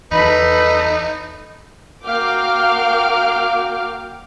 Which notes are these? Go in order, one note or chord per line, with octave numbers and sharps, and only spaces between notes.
E2 D#4 A4 B4 B5
A#3 F#4 F5 G5 D6 F6